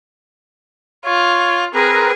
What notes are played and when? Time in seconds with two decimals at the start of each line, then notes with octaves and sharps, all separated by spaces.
1.05 F4 C#5
1.75 C4 G#4 A#4 B4 A#5